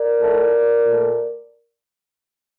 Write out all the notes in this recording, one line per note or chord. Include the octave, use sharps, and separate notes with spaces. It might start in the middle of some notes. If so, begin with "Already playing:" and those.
Already playing: A#4 D5
A2 A3
A#2 A3